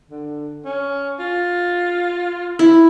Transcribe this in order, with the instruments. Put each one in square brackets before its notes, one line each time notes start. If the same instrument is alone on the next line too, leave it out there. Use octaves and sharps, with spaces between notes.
[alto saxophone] D3
C#4
F4
[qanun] E4